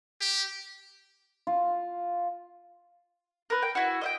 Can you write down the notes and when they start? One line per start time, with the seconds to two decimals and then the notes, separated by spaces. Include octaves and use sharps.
0.21 G4
1.47 F4
3.50 A#4 B4
3.62 G5
3.75 E4 F#4
4.01 D#5 E5 G5